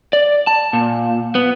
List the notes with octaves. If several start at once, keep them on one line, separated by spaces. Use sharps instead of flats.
D5
A5
A#2
B3